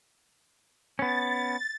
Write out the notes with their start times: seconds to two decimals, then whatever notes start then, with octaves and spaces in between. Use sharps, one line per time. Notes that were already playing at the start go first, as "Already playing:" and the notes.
0.99 B3 C#4 A6